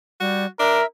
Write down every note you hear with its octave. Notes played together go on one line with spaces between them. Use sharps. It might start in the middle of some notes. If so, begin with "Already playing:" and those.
G3 F#4
D4 A#4 E5